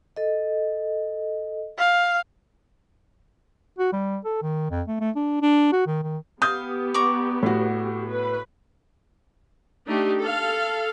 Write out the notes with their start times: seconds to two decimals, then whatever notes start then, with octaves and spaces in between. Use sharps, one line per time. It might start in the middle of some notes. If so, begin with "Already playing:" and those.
0.16 A4 D#5
1.78 F5
3.79 F#4
3.93 G3
4.25 A4
4.42 D#3
4.71 F2
4.88 A3
5.01 A3
5.16 D4
5.42 D4
5.72 F#4
5.87 D#3
6.03 D#3
6.42 B3 G4 F5 D#6 G6
6.94 D5 A#5 C#6
7.43 A2 F#4
8.09 B4
9.87 A3 D4 D#4 G4
10.20 A4 F5